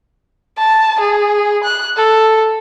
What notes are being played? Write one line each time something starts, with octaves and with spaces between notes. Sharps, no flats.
A5
G#4
F#6
A4